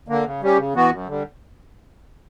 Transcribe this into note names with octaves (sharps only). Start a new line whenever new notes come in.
D3 A#3
C#3
G3 C#4 G4
C#3
E3 B3 F#4
F#2
D3 G3